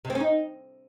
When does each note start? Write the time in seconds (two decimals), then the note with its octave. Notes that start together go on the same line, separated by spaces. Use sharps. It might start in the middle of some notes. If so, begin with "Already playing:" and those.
0.05 C3
0.10 C4
0.15 C#4
0.20 D#4